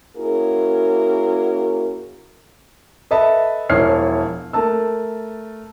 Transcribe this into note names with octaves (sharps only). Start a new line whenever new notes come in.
A#3 C#4 E4 F#4 G#4 A#4
A4 B4 D#5 E5 A5 B5
E1 F3 E4 C#5 F6 C7
A3 A#4 A5 E6